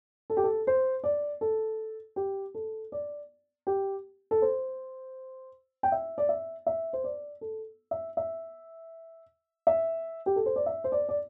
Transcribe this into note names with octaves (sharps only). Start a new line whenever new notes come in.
A4
G4
A4
C5
D5
A4
G4
A4
D5
G4
A4
C5
G5
E5
D5
E5
E5
C5
D5
A4
E5
E5
E5
G4
A4
C5
D5
E5
C5
D5
D5